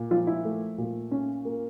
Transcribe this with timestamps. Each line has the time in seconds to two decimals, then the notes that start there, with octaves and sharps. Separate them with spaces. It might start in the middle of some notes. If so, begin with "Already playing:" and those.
Already playing: A#2
0.11 F3 F4
0.27 E4
0.45 A3
0.78 A#2
1.11 C#4
1.45 A#3